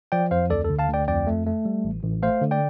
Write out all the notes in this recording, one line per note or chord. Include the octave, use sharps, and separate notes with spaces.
F3 D5 G5
F2 C5 F5
D2 A4 D5
A4
D3
F5 A5
D2 D5 G5
F2 D5 G5
A3
A3
G3
A1
A1
A3 C5 F5
D3
D5 G5